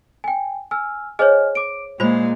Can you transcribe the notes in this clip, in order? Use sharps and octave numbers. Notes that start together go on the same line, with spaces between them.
G5 G#5
G#5 E6 F6
G#4 C5 C#5 D#5 G#5 F6
D6 D7
A#2 G#3 F4 C5 B5 F7